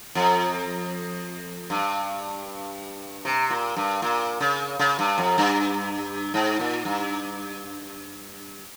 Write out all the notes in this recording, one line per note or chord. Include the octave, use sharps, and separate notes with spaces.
F2
G2
C3
A#2
G2
A#2
C#3
C#3
G2
F2
G2
G#2
A#2
G2